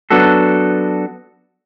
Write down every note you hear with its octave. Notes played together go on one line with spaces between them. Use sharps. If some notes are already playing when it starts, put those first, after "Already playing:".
F#3 B3 D4 F#4 A4